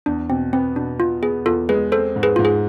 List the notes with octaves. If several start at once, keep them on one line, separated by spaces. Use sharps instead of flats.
E2 D4
B2 C4
B3 C4
B2 D4
B2 F4
B3 G#4
E2 F4 A4
G#3 G#4 B4
C4 A4 C5
G#2
G#4 B4
G#2 F4
G#4